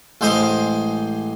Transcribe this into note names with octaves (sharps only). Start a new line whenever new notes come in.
A1 G#3 C5 D#5 F5